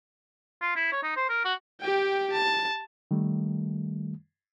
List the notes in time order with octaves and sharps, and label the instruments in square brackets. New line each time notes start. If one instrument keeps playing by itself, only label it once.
[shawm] F4
E4
C#5
D#4
C5
A#4
F#4
[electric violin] G4 G5
A5
[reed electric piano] D#3 G3 A3